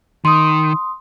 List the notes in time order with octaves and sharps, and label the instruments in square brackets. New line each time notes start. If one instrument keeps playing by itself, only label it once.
[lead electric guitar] D#3 [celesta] C6 D#6